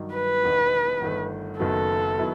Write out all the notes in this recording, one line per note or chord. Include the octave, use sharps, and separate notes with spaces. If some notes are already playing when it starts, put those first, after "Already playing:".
Already playing: G2 D#3 F#3
B4
E1 E2 D#3
G1 G2 D#3 A3
F#1 F#2 D#3 F#3 B3 A4
D#3 F#3 B3 E4